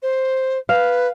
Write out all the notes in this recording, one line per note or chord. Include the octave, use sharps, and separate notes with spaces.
C5
B4 F5